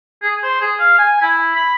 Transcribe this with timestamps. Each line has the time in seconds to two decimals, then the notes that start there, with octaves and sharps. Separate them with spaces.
0.22 G#4
0.43 C5
0.61 G#4
0.79 F5
0.98 G#5
1.22 E4
1.55 B5